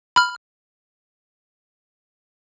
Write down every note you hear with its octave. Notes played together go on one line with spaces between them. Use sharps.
B5 F6